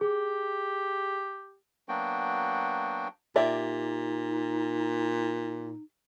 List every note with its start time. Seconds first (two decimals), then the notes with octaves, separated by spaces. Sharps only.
0.01 G4 G#4
1.89 F#3 A#3 B3 D4 F#4 G5
3.36 A#2 D#4 G4 D5 E5